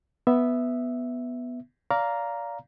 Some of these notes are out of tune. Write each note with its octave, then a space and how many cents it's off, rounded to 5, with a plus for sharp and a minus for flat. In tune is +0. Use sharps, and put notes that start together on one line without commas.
B3 +0 E5 +0
D5 -25 F5 +0 A#5 +5